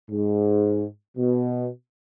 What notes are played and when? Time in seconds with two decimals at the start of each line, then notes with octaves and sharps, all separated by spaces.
0.10 G#2
1.18 B2